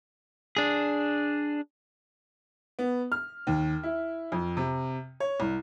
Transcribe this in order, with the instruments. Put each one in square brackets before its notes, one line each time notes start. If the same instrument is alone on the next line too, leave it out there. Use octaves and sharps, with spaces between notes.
[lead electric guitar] D4 G#4
[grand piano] B3
F6
D#2
E4
F2
C3
C#5
C2